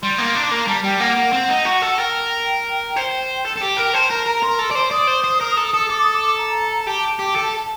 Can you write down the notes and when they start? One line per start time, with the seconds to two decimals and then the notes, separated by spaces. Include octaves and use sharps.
0.02 G3 C6
0.18 A#3
0.35 D4
0.51 A#3 A#5
0.68 G3 A5
0.84 G3 G5
1.00 A#3 F#5
1.17 A#3
1.33 C4
1.49 D#4
1.65 F#4
1.82 A4
1.98 A#4 G5
2.96 C5
3.45 A4
3.56 A4
3.61 G4
3.77 A#4
3.84 G5
3.94 C5 A5
4.10 A#4 A#5
4.26 A#4 A#5
4.42 A#4 C6
4.59 A4
4.71 D5
4.75 C5
4.91 D5 D#6
5.07 C5
5.24 C5
5.41 A#4
5.57 A4
5.74 A4
5.89 A4 D6
6.02 D#6
6.14 D6
6.38 A#5
6.82 A#5
6.87 G4 A5
7.19 G4
7.36 A4